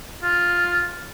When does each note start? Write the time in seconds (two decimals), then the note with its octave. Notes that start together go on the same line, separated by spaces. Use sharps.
0.23 F4